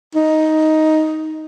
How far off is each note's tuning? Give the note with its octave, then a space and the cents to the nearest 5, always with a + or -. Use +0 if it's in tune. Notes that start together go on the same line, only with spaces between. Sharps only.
D#4 +10